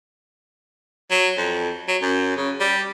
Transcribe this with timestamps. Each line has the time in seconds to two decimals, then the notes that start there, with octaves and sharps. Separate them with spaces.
1.10 F#3
1.38 F2
1.88 F#3
2.01 F#2
2.37 C#3
2.60 G3